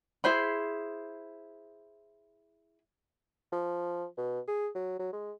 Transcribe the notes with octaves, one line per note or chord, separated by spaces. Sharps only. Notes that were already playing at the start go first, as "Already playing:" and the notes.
E4 G#4 C5 B5
F3
B2
G#4
F#3
F#3
G#3